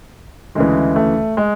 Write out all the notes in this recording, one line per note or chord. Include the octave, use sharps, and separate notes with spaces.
D2 C#3 E3 G#3
A3
G#3